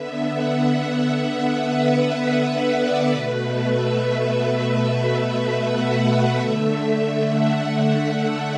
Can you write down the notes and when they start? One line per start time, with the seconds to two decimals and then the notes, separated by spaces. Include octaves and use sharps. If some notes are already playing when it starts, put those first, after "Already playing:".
Already playing: D3 B3 E5
0.23 F#5
0.64 F#5
1.05 E5
1.47 B4
2.29 E5
2.69 D5
3.11 B2 A3 B4
3.52 E5
3.92 E5
4.75 E5
5.57 F#5
5.97 E5
6.39 D3 A3 E5
7.21 F#5
7.61 E5
8.03 F#5